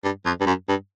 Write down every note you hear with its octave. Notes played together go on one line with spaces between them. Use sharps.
G2
F2
G2
F#2
G2